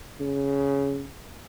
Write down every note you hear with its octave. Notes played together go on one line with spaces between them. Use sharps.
C#3